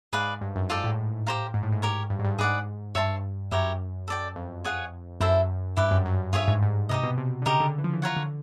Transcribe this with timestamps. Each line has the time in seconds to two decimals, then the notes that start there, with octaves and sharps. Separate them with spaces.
0.13 G#2 G#4 B4 D5 F5
0.41 G2
0.55 F#2
0.70 G#2 F4 A4 D5 G5
0.84 A2
1.27 G4 C5 F5 A#5
1.54 G#2
1.63 A2
1.72 G#2
1.82 G4 A#4 C#5
2.10 G2
2.19 G#2
2.25 G2
2.39 G#2 G#4 B4 D5 F#5
2.95 G2 C#5 E5 A5 C6
3.51 F#2 E4 G4 A#4 C#5
4.08 A4 D5 G5
4.36 F2
4.64 F4 G#4 C#5 F#5
5.21 F#2 E4 A4 C5 E5
5.77 G2 E4 G4 B4
5.91 F#2
6.05 F#2
6.33 G2 F4 G#4 C#5 E5
6.48 G#2
6.62 G#2
6.89 C3 D#4 G4 A#4 D#5
7.03 B2
7.18 C3
7.42 D3
7.46 C#3 D#4 G4 A#4
7.60 D3
7.78 E3
7.84 F3
7.93 E3
8.02 F4 A#4 C#5 F#5
8.17 D3